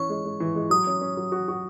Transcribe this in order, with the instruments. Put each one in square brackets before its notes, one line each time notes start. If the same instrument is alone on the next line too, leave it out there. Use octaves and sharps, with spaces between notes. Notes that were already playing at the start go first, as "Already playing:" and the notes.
Already playing: [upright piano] E3 C#4 [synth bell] C#6
[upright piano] G#3
G#3
E3
G#3
[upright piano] F#3 [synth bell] D#6
[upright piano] C#4
C#4
F#3
F#4
F#4